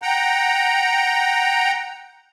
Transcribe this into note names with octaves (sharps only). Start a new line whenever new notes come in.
F#5 G5 A#5